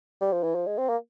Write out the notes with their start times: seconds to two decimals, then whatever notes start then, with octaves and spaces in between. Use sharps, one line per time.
0.21 G3
0.32 F3
0.43 E3
0.55 F3
0.67 G#3
0.78 C4
0.89 A#3